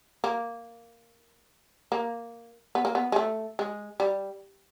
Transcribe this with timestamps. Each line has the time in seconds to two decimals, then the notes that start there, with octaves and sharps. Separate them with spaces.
0.24 A#3
1.92 A#3
2.75 B3
2.85 A#3
2.95 B3
3.12 G#3
3.16 A3
3.59 G#3
4.00 G3